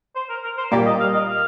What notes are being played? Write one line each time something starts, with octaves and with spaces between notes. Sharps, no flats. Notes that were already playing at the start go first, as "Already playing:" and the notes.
C5
A#4
A#4
C5
A#2 G3 A#3 D5
D#5
F5
D#5
F5